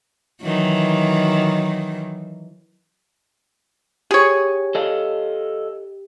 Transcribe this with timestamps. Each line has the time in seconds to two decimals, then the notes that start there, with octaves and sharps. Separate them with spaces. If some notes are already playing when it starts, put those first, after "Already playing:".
0.42 D#3 E3 F#3
4.11 G4 G#4 C#5
4.75 A4 D#5 F5